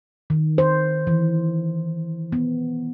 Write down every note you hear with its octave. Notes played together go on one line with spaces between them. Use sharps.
D#3
C5
E3
B3